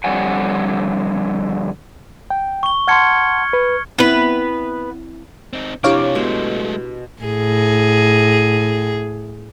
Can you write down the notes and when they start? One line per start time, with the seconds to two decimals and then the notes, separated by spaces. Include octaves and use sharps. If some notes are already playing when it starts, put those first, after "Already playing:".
0.04 F2 D3 G3 C#5 F#5 G#5
2.30 G5
2.63 C#6 G7
2.88 F#5 A5 C6 F6 G#6 C#7
3.53 B4
3.99 B3 C4 E4 B4
5.53 C4 D#4
5.84 C3 D4 E4 F4 G4 C#5 F5 D6
6.15 B2 G#3 A3 C5
7.23 A2 G#4